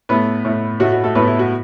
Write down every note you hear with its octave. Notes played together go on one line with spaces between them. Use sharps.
A2 A3 B3 B4
A2 A3
A2 A3 F#4
F#4
A3 A4
A2 A3 B3 B4
E4
F#4